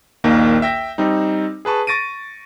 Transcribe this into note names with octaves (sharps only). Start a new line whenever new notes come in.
A#1 D#2 D#3 A#3
E5 G5 A#6
G3 C4 D#4
G#4 B4 A5 C#6
C#6 A6 A#6 D7 D#7